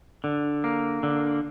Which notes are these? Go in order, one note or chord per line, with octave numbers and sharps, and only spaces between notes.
D3
A#3
D3